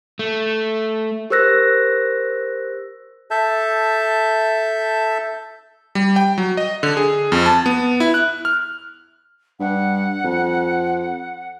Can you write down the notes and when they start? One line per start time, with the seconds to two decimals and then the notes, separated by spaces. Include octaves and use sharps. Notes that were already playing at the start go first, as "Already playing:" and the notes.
0.19 A3
1.30 G4 A#4 C5 E6 F#6 A#6
3.31 A4 E5 A5 G6
5.95 G3
6.16 G5
6.38 F#3
6.57 D#5
6.83 D3
6.97 G#4
7.32 F2
7.46 A5
7.66 B3
8.00 E4
8.14 F#6
8.45 F6
9.60 G2 F#5
10.25 F2